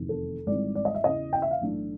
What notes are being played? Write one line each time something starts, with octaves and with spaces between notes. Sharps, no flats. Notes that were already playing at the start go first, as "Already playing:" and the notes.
Already playing: F1 E2 C3 D#3
A4
G#1 G#2 E3 G3 C4 D5
D5
D#5
E5
E2 C#3 E3 D#5
G5
E5
F5
B1 A2 E3 A3 D4